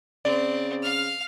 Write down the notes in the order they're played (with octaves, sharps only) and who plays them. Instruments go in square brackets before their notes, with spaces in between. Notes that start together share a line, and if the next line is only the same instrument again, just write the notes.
[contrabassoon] C#3 [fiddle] C4 [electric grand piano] D5
[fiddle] F5 F6